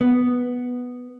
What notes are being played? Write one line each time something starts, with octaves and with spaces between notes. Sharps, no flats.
B3